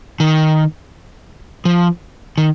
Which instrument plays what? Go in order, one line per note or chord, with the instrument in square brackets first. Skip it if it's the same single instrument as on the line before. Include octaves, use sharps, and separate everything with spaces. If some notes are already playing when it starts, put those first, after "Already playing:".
[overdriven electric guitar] D#3
F3
D#3